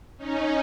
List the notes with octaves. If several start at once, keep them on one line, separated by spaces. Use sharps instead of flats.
C#4 D#4